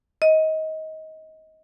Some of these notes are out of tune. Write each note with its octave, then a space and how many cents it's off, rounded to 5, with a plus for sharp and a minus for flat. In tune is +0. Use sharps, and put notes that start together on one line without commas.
D#5 +20